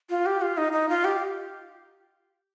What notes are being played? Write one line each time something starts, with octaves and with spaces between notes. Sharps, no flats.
F4
G4
F4
D#4
D#4
F4
G4